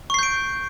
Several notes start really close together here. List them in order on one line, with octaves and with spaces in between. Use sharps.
C#6 C7 G6 D7